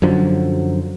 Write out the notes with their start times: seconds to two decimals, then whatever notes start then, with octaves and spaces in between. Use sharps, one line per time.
0.02 F#2 D3 F3 F#3